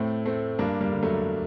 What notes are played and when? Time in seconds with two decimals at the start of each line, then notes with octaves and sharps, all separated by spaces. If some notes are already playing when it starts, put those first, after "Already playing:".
Already playing: A2 A3 C4
0.26 A3 C4
0.59 G2 A#3 D4
0.81 G3 A#3
0.91 D3
1.03 F#3 A3